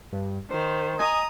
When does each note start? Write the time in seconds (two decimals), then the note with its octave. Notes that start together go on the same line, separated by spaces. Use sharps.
0.13 G2
0.51 D#3 C5
0.99 D#5 G#5 A#5 D#6